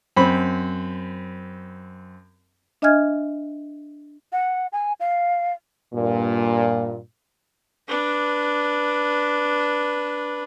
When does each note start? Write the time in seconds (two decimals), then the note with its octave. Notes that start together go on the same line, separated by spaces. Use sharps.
0.17 F#2 C4 B5
2.82 D4 D#5 E5 G#5 F6 G#6
4.33 F#5
4.73 G#5
5.00 F5
5.94 G2 A#2
7.88 D4 B4